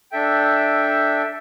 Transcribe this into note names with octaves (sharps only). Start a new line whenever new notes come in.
D4 A4 E5 G5